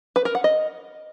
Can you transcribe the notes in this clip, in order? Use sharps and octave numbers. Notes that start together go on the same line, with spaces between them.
B4
A#4
F#5
D#5